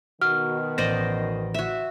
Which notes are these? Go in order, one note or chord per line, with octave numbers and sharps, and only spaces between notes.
B2 D#3 F#4 F6
A1 C5 D5 D#5 A#6
F#4 E5